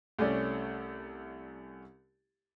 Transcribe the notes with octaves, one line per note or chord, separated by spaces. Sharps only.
C2 A3 C#4 D5